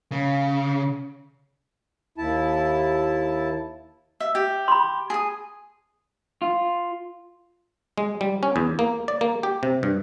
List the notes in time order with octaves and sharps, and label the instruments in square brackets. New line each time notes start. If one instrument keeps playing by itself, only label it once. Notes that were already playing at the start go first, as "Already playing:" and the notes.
[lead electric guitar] C#3
[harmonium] D#2 E4 A5
[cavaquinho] E5
G4
[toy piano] B5 C6
[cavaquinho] G#4 D#6
[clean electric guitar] F4
[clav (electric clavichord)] G#3
G3
C#4
E2
A#3
D5
A#3
G4
C3
G2